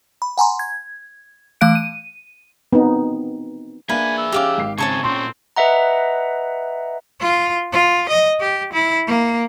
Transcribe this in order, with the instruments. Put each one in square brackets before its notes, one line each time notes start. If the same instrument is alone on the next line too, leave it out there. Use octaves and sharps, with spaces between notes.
[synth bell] B5
F#5 G#5 A#5 C6
G#6
E3 A3 F5 F#6 D7
D#7
[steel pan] B3 C4 D#4
[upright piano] A#3 D4 F5 [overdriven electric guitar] G#4 E5 [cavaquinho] B4 [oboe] G#5
[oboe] E6
[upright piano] C#4 G7 [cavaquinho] G4 F5 D6
[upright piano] G#1 C7
[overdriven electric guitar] C#3 C4 [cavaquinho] C#5 A5 C#6 [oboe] G#5
[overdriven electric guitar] A#2 C#4 [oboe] C4 [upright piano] C6
[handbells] B4 D#5 E5 F#5 A#5
[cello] F4
F4
D#5
G4
E4
A#3